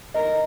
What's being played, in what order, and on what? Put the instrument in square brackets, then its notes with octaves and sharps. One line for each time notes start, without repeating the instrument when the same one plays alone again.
[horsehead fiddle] A#4 [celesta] D#5